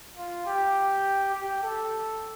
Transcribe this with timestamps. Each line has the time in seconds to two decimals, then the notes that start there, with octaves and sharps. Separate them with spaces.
0.17 F4
0.46 G4
1.34 G4
1.63 A4